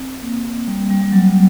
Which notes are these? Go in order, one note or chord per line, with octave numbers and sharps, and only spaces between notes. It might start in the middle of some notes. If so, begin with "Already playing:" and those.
Already playing: C4
A#3
G3
G3
G3
F#3